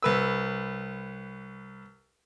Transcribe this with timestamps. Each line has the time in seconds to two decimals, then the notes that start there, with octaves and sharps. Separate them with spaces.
0.03 C2 B4 E6